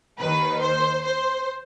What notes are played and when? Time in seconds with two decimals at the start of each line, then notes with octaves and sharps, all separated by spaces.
0.20 D#2 D#3 B4
0.61 C5
1.03 C5